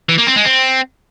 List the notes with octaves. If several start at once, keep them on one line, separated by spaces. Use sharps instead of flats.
E3
A#3
C4
G#3
C4